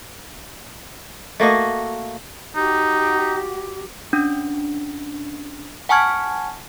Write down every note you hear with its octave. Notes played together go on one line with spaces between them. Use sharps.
A3 A#3 F#4 D#5
D#4 F#4 G4
C#4 D4
F#5 G#5 A5 C#6 F6 G#6